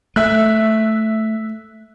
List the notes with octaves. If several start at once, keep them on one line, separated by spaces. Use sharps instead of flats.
A3 E5 F#6